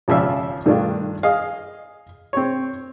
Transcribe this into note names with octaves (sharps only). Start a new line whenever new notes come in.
G#1 C#3 F3 D5 E5
G2 D#3 A3 D4 F4
G#4 D#5 F5
C4 C#5